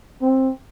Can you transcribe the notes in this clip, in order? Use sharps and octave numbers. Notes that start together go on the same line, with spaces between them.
C4